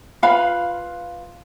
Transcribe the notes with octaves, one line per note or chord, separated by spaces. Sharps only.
F4 B4 F5 B5